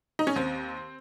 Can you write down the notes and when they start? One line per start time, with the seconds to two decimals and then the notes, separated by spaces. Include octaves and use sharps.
0.19 D#4
0.27 C#4
0.36 D#2 C4